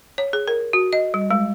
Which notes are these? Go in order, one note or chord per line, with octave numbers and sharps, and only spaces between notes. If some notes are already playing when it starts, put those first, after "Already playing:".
C#5
G#4
A#4
F#4
D#5
G3
G#3